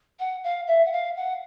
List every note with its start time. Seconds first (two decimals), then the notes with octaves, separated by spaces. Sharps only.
0.19 F#5
0.43 F5
0.67 E5
0.85 F#5
0.92 F5
1.16 F#5